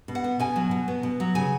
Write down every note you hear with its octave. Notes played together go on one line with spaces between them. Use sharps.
B2
F#5
B3
B2 G#5
F#3
B2
B3
B2
F#3
C#3 G#5